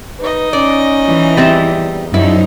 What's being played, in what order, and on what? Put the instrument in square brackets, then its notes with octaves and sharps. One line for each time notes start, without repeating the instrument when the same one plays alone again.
[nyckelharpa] D#4 D#5 [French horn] B4
[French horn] C#4 [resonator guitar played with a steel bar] D5
[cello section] E3
[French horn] E2 [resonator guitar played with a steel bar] G3 C4 E5
[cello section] F#2 F3 D#4 [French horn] G3 [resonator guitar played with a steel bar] E4